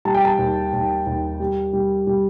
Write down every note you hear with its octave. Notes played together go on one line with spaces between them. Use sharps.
G3 A5
G5
A5
D#2
D#2
D#2
G3
G3
G3